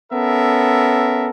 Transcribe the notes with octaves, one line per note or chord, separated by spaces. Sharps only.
B3 C#4 A4 A#4 E5